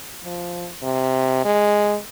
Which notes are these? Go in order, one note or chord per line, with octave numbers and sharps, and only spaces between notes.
F3
C3
G#3